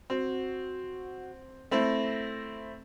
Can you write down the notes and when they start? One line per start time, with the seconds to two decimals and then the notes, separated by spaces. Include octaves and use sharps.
0.10 C4 F#4
1.71 A3 C4 E4 A#6